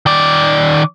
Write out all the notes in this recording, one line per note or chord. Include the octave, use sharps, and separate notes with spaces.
D#3 D5